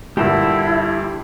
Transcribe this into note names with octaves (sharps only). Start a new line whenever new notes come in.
G2 A#2 D3 E4 G4 A5 E6